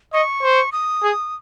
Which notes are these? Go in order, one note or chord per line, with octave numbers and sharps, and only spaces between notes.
D#5 C#6
C5
D#6
G#4